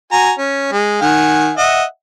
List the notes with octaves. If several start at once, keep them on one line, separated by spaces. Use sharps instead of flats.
F#4 G#5 A#5
C#4
G#3
D#3 F#5 G#5
D#5 E5 F#5